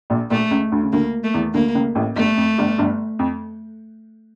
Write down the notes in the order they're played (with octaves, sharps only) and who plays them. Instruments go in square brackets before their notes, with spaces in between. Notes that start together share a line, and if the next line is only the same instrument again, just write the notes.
[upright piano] A#1 A#2
[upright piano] A#1 A#2 [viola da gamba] A3
[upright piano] C#2 C#3
D2 D3
C#3
[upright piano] D2 D3 [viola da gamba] A#3
[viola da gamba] A3
[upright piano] E2 E3
[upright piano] D2 D3 [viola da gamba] A#3
[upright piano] C#2 C#3
A1 A2
[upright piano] G1 G2 [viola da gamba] A3
[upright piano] F2
G1 G2
G1 G2
F2